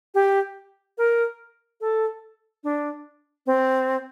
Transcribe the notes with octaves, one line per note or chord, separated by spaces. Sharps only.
G4
A#4
A4
D4
C4